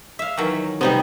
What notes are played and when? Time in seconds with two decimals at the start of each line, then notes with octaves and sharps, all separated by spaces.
0.19 E5 F5
0.37 D#3 E3 F#3
0.81 C3 G3 B3 D#4